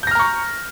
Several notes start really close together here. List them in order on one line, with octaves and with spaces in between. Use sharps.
G6 A#6 F6 A#5 C#6